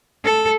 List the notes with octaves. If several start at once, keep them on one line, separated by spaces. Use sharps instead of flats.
A4